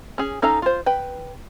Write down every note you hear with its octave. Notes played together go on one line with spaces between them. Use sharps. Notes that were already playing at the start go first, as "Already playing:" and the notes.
C#4 G#4
C#4 D#4 A4 F5 A#5
F4 C5
B4 G5